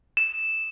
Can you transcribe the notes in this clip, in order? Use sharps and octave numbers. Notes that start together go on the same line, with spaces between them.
E7